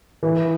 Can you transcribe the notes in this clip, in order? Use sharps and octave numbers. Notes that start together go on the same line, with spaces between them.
E3